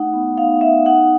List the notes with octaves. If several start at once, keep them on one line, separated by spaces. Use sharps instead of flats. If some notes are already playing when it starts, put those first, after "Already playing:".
Already playing: A3 D#4 F#5
B3
D#4 F5
D#4 E5
D#4 F#5